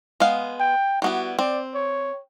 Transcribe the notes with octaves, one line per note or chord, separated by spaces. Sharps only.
G#3 B3 F5
G5
G3 B3 E4 F#4
C4 D5
C#5